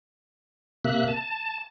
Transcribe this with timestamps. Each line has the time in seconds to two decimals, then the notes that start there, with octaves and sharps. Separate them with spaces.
0.85 C3 A#3 E5 F#6
1.08 A5